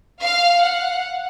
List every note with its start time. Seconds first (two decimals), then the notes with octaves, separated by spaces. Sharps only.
0.23 F5
0.62 F#5